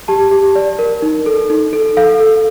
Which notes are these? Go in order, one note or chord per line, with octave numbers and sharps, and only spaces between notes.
G4 A5
G4
D5
A#4
D#4
A4
D#4
A4
A4 F5
A4